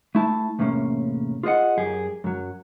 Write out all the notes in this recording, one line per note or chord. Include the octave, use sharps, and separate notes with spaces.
A3 E4 A5
E2 A2 C3 A#3 C#4
F4 G#4 A#4 D#5 F#5
F#2 G4 G#4
F#2 F#3